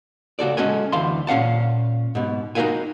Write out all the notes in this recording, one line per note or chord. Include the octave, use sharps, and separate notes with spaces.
C#3 F#4 A4 D5
G#3 C#4 F#4 A4 G#5
D2 E3 F5 A5 C6
A#2 C#4 F5 F#5 A5
G#2 B2
D#4 F#4 G#4 A#4 F5 G#5